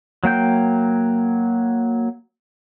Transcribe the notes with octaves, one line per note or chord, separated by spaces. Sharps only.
F#3 A#3 G5 G6